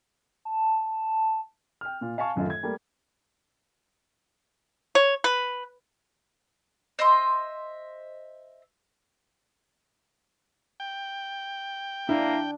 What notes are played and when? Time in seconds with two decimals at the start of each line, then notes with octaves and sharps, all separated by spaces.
0.45 A5
1.81 G5 F6
2.01 A#2 F4
2.18 F5 G#5 A5 C#6
2.36 D1 F#2 D#3 F4 A4
2.50 G#6
2.63 G3 A3 A#3 A#4
4.95 C#5
5.24 B4
6.99 C5 D#5 E5 C6
10.80 G5
12.09 A#3 D4 E4